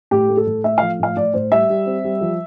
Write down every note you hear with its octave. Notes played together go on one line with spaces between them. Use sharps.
A2 G4
A3
A4
A2
A3 E5
F3 F5
A2 F5
A2 D5
A2 C5
G3 E5
G3
C4
G3
F3